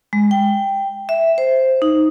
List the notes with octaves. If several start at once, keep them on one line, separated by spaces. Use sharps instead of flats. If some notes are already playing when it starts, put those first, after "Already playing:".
G#3
G5
E5
C5
D#4